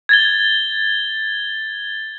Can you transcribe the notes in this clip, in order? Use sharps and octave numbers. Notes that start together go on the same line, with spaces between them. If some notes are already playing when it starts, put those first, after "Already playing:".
G#6 A6 G7